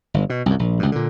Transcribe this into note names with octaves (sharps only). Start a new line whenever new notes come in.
G1
B2
C2 F#2
A#1
C#2 G2
A#2 D3